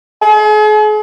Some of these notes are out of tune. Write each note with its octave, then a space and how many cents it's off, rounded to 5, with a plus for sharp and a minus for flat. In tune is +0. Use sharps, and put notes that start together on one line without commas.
G#4 +40